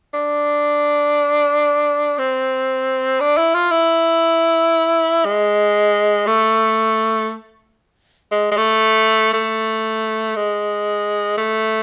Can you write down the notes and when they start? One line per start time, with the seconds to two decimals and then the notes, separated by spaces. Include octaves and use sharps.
0.13 D4
2.18 C4
3.20 D4
3.37 E4
3.55 F4
3.71 E4
5.25 G#3
6.27 A3
8.31 G#3
8.51 G#3
8.57 A3
9.33 A3
10.36 G#3
11.37 A3